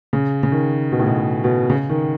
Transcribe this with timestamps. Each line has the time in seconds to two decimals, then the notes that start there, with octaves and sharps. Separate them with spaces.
0.13 C#3
0.43 C#3
0.52 D#3
0.92 B2
0.99 A2
1.07 B2
1.17 A2
1.44 B2
1.70 C#3
1.89 D#3